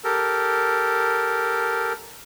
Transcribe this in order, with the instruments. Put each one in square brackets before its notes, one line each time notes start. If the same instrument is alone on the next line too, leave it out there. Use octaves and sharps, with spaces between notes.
[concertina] G4 A4 A#4